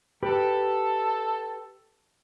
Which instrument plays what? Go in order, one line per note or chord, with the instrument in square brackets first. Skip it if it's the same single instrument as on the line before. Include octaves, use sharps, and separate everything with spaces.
[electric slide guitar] G4 B4 [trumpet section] A4